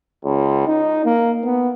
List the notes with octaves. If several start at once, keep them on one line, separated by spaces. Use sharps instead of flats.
C#2
D#4
A#3
B3